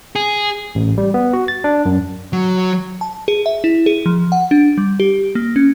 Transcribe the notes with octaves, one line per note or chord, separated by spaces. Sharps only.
G#4
A1
G3
B3
F#4
A6
D4
F#2
F#3
A5
G#4
E5
E4
G#4
F3
F#5
D4
G3
G4
A#3
C#4